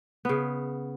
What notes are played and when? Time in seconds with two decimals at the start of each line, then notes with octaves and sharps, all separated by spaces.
0.25 C#3 B3